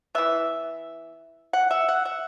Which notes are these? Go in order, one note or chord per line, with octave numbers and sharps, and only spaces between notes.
E3 B3 E5
F#5
E5
F#5
E5